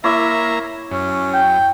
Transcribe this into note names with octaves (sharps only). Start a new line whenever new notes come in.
A#3 E4 C#5 E5 A#5 D6
F#2 C#4
G5